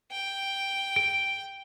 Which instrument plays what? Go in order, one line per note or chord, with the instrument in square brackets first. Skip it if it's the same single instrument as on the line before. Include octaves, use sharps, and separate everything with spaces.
[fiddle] G5
[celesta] D7